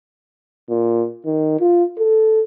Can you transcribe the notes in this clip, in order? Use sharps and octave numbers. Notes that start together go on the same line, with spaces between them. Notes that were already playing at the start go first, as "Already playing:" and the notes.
A#2
D#3
F4
A4